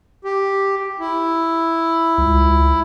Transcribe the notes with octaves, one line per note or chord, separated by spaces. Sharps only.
G4
E4
C#2